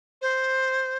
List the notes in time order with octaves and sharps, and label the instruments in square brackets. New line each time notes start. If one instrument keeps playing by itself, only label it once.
[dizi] C5